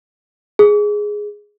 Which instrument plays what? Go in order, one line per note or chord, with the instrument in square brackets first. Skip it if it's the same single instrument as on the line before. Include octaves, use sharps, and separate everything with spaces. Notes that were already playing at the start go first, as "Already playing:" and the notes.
[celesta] G#4